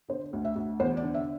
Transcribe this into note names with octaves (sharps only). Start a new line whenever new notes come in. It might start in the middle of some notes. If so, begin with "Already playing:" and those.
D3 C5
D2
E5
D2
E2 C5
D5
D3
E5